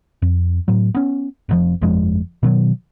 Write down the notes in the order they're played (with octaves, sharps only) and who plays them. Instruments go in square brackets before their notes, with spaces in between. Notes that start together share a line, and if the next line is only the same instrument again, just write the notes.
[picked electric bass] F2
A2 F#3
B3 C#4
F1 F2 F3
G1 F2 F3 G#3
B2 D#3 F#3